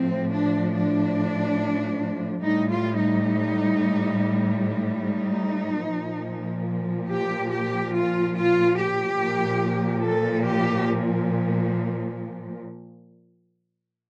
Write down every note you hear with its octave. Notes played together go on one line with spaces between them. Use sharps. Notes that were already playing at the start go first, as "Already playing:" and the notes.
Already playing: A2 F3 C4
D4
D4
A2 G3 D#4
F4
D#4
D#4
A#2 F3
G4
G4
F4
F4
G4
A#2 F3
A4
G4